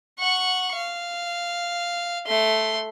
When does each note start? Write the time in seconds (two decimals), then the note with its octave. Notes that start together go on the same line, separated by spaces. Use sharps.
0.19 F#5 C#6
0.76 F5
2.27 A3 C6